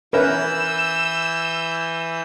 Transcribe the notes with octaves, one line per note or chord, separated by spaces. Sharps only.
E3 C#4 A#4 B4 E5 E6 G6